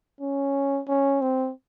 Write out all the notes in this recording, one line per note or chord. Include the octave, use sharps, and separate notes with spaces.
C#4
C#4
C4